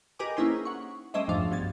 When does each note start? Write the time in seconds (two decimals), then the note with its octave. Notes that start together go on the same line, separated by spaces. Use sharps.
0.19 G4 A#4 B4 D#5 G#5 D6
0.37 A#3 C#4 D#4 E4 G#4 C5
0.65 F#5 C#6
1.14 G3 A3 C#4 C5 D#5 E5
1.28 F2 G#2 F3 D4 F5
1.51 B1 G2 G#6 A6